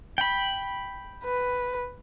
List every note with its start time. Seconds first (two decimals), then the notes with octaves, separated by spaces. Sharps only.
0.18 G5 B5
1.25 B4